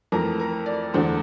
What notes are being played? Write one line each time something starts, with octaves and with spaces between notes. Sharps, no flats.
F2 E3 A3 A#4
A#4
D5
E2 D3 A3 D4 C5